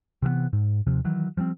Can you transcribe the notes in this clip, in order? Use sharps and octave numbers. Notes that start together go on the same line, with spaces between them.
C3 E3 F3 B3
G#2
D#2 C3 F3
D#3 E3 F#3
F3 G3 G#3 C4